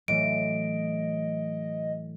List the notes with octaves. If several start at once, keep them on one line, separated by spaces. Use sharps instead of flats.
A2 E3 F#3 A3 D#5 D7